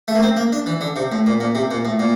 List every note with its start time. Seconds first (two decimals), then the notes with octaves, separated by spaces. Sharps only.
0.08 A3
0.15 A#3
0.23 C4
0.37 A#3
0.52 D4
0.66 E3
0.81 D3
0.96 C3
1.12 A2
1.26 A#2
1.40 A#2
1.55 C3
1.71 A#2
1.85 A2
1.99 A#2